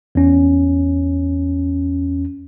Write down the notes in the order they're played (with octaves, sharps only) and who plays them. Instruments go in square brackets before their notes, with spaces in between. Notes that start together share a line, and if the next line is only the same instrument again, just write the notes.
[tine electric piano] E2 C#4